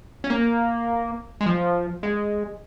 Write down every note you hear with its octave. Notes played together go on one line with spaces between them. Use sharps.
C#4
A#3
G#3
F3
G#3